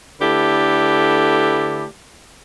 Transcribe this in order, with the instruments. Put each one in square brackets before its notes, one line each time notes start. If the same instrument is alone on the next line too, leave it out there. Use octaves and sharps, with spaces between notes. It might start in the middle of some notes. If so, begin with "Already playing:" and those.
[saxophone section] D3 A3 E4 G4 B4 D5